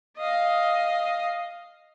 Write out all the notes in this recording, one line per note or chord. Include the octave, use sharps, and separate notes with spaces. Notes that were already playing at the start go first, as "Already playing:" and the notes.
D#5 F5